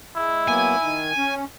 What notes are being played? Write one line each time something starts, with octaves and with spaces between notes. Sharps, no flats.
G#3 E4
F#3 A#3 B3 G#5
D#3
C#4